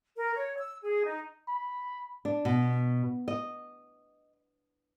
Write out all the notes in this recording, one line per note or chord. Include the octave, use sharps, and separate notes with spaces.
A#4
C#5
E6
G#4
D#4
B5
D4
B2
D#5